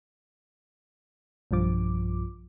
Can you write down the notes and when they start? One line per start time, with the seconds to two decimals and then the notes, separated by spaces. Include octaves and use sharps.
1.51 B1 G2 F3 D6